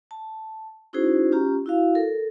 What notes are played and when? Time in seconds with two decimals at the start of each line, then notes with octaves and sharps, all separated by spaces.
0.11 A5
0.93 C#4 D#4 E4 F#4 G#4 C5
1.32 C#4 F4 G4 A#5
1.66 E4 F#4 F5
1.95 A4 A#4